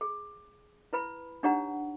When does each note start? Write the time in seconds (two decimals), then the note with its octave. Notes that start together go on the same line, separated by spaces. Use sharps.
0.01 G#4
0.93 E4 B4 B5
1.43 D4 D#4 G4 C#5 F#5 A#5